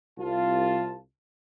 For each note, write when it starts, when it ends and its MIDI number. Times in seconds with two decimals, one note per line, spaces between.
0.19 0.98 36
0.19 0.98 65
0.19 0.98 81